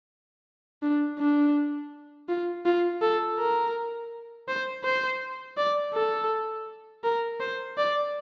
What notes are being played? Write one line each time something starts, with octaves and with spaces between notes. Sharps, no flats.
D4
D4
F4
F4
A4
A#4
C5
C5
D5
A4
A#4
C5
D5